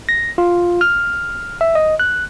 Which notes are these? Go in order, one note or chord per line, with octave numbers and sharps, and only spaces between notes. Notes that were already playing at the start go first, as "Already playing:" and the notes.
A#6
F4
F6
E5
D#5
F#6